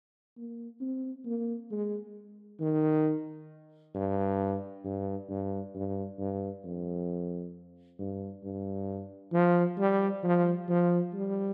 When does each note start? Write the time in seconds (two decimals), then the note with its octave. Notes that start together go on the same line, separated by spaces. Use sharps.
0.37 A#3
0.81 C4
1.25 A#3
1.71 G#3
2.61 D#3
3.95 G2
4.85 G2
5.29 G2
5.75 G2
6.19 G2
6.65 F2
7.99 G2
8.44 G2
9.33 F3
9.78 G3
10.23 F3
10.69 F3
11.14 G3